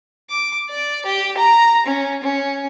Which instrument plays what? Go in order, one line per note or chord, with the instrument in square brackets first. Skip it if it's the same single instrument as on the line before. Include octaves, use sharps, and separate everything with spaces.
[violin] D6
D5
G4
A#5
C#4
C#4